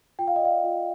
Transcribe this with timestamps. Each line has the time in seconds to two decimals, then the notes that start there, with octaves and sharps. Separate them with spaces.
0.19 F4 G5
0.28 F5
0.36 D#5
0.41 D5 F5
0.64 F4